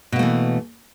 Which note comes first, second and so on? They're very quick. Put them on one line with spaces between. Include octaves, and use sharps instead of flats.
B2 A#3 A3 E3